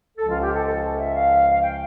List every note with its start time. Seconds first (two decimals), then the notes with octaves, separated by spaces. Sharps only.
0.18 C#2 C#3 F3 C#4 A4
0.30 F4
0.42 G4
0.54 A4
0.66 A4
0.98 E5
1.15 F5
1.51 F5
1.63 G5